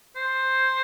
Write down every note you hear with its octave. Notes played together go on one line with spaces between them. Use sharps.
C5